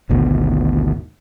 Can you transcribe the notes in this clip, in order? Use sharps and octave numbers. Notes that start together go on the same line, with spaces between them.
G#1 D2 B2 D#3